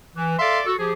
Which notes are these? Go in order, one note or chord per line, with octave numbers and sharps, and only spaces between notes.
E3
A4 D5 E5 F5 C6
F#4 A4
F3 G4 G#4